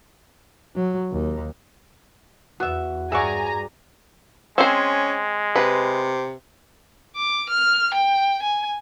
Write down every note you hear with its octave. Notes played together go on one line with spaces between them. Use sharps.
F#3
D#2
E2 B3 F#4 E5
G2 G#4 D5 E5 F#5 G#5 A#5 C#6
G#3 C4 C#4 C5
C3 B4
D6
F6
G5
G#5